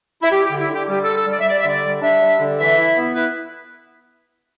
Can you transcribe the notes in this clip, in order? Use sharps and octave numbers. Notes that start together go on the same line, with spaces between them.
E4
G3 G4
D3 G4
E4
D3
G4
G3 G4
D3 A4
A4
G3
D5
E5
G3 D5
E5
D3 D5
G3
D4 E5
G3
D3
E3 E5
E4
B3
E4 B4